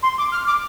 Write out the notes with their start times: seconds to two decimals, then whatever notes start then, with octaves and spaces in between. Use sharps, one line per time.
0.03 C6
0.18 D6
0.32 F6
0.47 D6